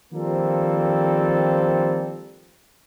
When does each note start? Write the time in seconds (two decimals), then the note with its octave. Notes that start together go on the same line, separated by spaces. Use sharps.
0.13 D#3 F3 G3 A#3 C4 A4